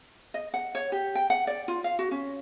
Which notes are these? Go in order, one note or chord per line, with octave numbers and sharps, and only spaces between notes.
D#5
F#5
C#5
G4
G5
F#5
D5
F4
F5
F#4
C#4